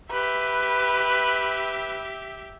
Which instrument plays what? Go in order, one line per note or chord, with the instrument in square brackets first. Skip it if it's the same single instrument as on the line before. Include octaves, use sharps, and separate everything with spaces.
[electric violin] G4 E5 [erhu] B4